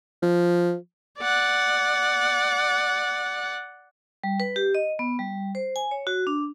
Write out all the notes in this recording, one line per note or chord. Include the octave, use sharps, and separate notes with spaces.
F3
D5 F#5
G3
B4
G4
D#5
B3
G3
C5
G#5
C#5
F#4
D4